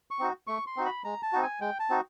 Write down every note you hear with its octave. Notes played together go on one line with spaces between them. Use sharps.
C#6
C4 D#4 F#4
A3 C#6
C6
C4 D#4 F#4
B5
G#3 A#5
A5
C4 D#4 F#4
G#5
G#3 G5
A5
C4 D#4 F#4